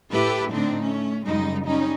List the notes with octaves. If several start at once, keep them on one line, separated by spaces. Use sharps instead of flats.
A2 E4 G4 A4 B4
A2 D3 C4 D4 D#4
A3 C#4
F#2 C#3 G3 G#3 D#4
G3 C#4 D#4